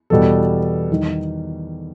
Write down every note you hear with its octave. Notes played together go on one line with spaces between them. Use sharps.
E2 B2 G3 A4
E2 D#3 G3